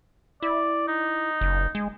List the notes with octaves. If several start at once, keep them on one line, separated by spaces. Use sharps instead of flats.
E4 D5
D#4
F#1
G#3